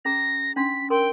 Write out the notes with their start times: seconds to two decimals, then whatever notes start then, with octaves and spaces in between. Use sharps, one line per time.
0.05 C#4 G#4 A#5 A#6
0.56 C#4 D4 C6 B6
0.90 A#4 G5 C6 E6